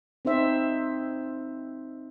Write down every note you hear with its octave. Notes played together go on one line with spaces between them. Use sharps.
C4 D#4 C5 E5